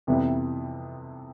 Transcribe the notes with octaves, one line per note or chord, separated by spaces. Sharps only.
F2 C3 E3 G3 B3